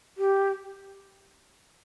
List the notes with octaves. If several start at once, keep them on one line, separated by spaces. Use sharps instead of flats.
G4